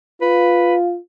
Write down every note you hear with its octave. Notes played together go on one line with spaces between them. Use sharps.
F4 B4